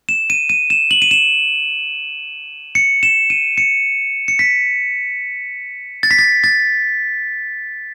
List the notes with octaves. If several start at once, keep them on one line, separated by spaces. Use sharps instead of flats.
E7
D#7
D#7
E7
F#7
D#7
E7
C#7
E7
D#7
C#7
C#7
B6
A6
B6
A6
A6